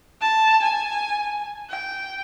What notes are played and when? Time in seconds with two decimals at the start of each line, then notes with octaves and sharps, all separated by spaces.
0.21 A5
0.62 G#5
1.70 G5